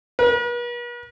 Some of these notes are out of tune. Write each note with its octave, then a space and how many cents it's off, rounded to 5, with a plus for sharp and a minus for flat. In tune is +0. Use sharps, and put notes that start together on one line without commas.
B4 -45